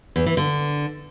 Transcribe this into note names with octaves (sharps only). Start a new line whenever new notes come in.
E2
E3
D3